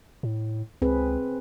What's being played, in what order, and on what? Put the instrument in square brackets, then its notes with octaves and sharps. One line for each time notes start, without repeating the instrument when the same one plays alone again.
[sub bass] A2
[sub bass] C#2 [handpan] C4 G#4 B4